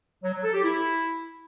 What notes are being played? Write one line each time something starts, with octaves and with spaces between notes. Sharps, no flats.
F#3
F#3
A4
G4
E4